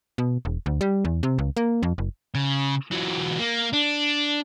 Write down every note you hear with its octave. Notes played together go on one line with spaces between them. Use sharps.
B2
E1
D2
G3
E2
C3
C#2
A#3
F2
F#1
C#3
E3 F#3
A#3
D4